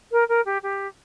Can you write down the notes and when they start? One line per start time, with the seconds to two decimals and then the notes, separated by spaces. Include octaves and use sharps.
0.11 A#4
0.28 A#4
0.45 G4
0.63 G4